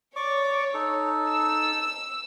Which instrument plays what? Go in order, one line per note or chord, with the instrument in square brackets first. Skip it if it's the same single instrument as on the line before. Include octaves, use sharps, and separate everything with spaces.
[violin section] C#5 [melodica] D5 C#6 D6
[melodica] D#4 A4
[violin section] E6